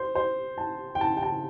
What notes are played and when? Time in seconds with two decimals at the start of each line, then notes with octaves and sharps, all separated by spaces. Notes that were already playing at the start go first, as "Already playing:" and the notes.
Already playing: C5
0.15 C5
0.58 A5
0.95 G5
1.01 A5
1.17 G5
1.23 A5